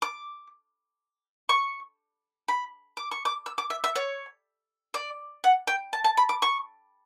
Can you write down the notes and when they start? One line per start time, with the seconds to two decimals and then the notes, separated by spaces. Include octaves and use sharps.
0.02 D6
1.49 C#6
2.48 B5
2.97 D6
3.11 C#6
3.25 D6
3.46 E6
3.58 D6
3.70 E5
3.84 E5
3.96 C#5
4.94 D5
5.44 F#5
5.67 G5
5.93 A5
6.04 A5
6.17 B5
6.29 D6
6.42 C#6